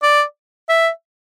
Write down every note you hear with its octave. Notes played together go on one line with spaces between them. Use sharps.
D5
E5